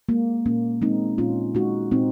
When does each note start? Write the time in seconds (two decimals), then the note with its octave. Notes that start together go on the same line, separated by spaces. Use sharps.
0.09 G#3 A#3
0.46 A#2 A#3 C#4
0.82 G#3 C4 D#4
1.18 A#2 C#4 F4
1.55 G#3 D#4 F#4
1.91 A#2 C4 D#4